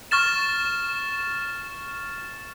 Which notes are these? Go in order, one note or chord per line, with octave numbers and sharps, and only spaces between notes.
C#6 F6 A6 E7